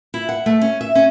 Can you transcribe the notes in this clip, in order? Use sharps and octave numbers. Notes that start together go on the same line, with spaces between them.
E4
F#5
A3
C#4
E5
C#4